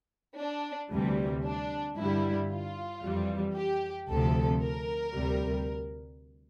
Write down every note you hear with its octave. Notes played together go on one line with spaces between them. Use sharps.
D4
D2 C3 E3 G3
D4
G2 D3 G3 E4
F4
F2 E3 G3
G4
D2 C3 F3 A4
A#4
D2 C3 G3